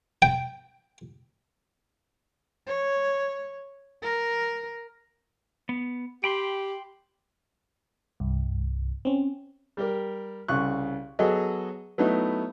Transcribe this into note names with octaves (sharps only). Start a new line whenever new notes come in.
G5
C#5
A#4
B3
G4 G5 B5 C6
C2 G2
C4 C#4
G3 G4 A#4
C2 C#3 C#6 F#6
F#3 B3 F#4 G#4 A4 D#5
F#3 A3 B3 D#4 E4